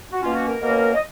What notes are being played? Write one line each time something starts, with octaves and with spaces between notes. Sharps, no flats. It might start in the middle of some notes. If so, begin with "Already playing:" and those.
F#4
B2 A#3 C#4 F4
F#4
A#4
B2 A#3 C#4 A#4
D#5